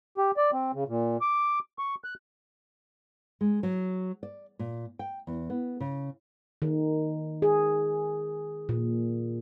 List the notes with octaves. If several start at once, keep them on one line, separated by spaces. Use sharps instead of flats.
G4
D5
C4
C#3
A#2
D6
C#6
F#6
G#3
F#3
D5
A#2
G5
E2
B3
C#3
D#3
G#4
A#2